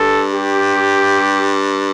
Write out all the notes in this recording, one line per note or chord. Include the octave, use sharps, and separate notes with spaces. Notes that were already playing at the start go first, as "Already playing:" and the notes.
Already playing: G2 A4
G4